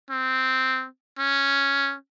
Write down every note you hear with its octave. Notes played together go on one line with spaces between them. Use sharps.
C4
C#4